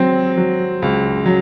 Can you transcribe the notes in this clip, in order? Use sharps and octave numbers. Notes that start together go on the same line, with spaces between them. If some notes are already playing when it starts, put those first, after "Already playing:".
Already playing: F#3 C4
F#3
C#2
F#3